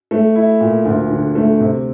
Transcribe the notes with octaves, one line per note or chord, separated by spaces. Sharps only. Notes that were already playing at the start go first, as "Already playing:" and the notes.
A3
E4
A#2
D2
D3
A3
C3